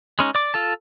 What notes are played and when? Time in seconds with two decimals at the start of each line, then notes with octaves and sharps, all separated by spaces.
0.19 G#3 C#4 D#4
0.35 D5 D6
0.54 F4 A4 A5